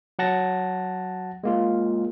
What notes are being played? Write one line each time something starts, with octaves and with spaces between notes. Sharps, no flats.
F#3 F#5 A5 A#6
G#3 A#3 F4